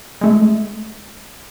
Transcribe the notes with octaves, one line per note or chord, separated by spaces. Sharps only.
G#3 A3